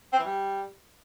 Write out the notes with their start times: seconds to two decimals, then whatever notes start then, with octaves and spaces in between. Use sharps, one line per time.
0.12 C4
0.19 E3
0.25 G3